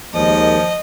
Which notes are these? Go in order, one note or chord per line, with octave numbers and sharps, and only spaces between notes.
D#2 D#3 F3 G#3 D#5